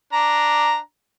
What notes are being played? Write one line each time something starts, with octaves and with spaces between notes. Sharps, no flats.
D4 A#5